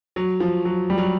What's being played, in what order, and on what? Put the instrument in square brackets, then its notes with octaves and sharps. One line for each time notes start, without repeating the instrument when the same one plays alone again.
[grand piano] F#3
F3
F#3
G3
F#3